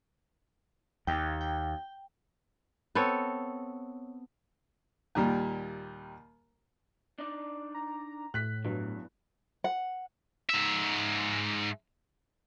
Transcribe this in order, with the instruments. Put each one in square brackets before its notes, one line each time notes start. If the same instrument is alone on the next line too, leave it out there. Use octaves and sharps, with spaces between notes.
[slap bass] D#2 [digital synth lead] G5
[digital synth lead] G5
[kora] B3 C4 A4 C#5
[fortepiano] D#2 A#2 G3
[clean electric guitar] D4 D#4 D5
[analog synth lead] A#5
[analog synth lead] A2 [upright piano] F#6 B6
[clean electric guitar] E2 E3 [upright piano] G2 F#3
[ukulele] F#5
[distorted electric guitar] G#2 E5